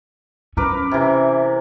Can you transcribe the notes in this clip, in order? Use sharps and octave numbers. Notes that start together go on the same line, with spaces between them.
C#4 A#4 B4 D6
C3 E3